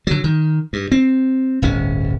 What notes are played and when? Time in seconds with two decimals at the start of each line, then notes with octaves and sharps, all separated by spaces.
0.07 D3 F#3
0.24 D#3
0.73 G2
0.92 C4
1.62 D1 G1 C#4